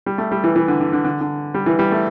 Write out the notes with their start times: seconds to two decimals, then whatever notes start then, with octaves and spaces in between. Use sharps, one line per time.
0.06 G3
0.18 A3
0.31 G3
0.44 E3
0.56 E3
0.68 D3
0.81 D3
0.93 D3
1.05 D3
1.21 D3
1.54 G3
1.66 E3
1.79 G3
1.92 A3